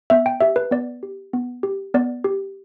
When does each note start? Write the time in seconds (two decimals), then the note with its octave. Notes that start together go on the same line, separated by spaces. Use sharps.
0.10 B3 E5
0.26 G5
0.41 G4 E5
0.56 B4
0.71 B3 D5
1.03 G4
1.33 B3
1.63 G4
1.94 B3 D5
2.24 G4